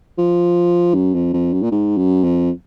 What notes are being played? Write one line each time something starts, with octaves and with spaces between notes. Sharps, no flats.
F3
F#2
F2
F2
F#2
A#2
G#2
F#2
F2